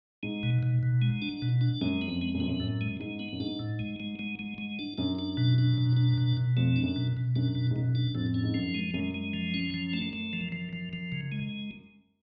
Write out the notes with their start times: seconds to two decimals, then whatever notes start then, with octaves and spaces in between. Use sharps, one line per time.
0.23 G#2 G#3
0.43 B2
0.63 B2
0.83 B2
1.02 G#3
1.22 D4
1.42 B2
1.61 D4
1.81 F#2 G#3
2.02 B3
2.08 F2
2.22 G#3
2.34 F#2
2.40 F2 B3
2.48 F#2
2.60 F#2 A2
2.81 G#3
3.00 G#2 G#3
3.19 B3
3.33 F#2
3.40 G#2 D4
3.59 A2
3.79 G#3
4.00 G#3
4.19 G#3
4.39 G#3
4.58 G#3
4.79 D4
4.98 F#2 D4
5.19 D4
5.37 B2
5.58 D4
5.78 B2
5.97 D4
6.18 B2
6.37 B2
6.56 F2 A3
6.76 D4
6.83 F#2
6.96 B2
7.17 B2
7.36 F#2 D4
7.55 B2
7.71 G#2
7.76 F#2 B2
7.95 D4
8.15 F2 A2
8.34 C#4
8.43 G#2
8.54 F#2 F3
8.74 G#3
8.94 F#2 G#3
9.14 G#3
9.33 F3
9.54 C#4
9.74 F3
9.93 A3
10.13 A3
10.33 F3
10.52 F3
10.73 F3
10.93 F3
11.12 C#3
11.32 G#3